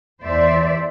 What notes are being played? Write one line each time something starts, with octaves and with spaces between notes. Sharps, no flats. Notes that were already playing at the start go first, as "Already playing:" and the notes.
E2 E3 C5 D5 E5